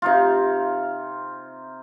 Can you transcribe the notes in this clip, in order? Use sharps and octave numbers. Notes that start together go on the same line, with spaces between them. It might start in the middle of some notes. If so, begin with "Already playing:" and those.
C3 D#4 F4